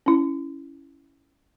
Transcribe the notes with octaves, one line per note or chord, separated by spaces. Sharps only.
C#4 E4